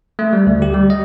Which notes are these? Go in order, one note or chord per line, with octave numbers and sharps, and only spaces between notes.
A3
G3
D2
G4
G3
D#5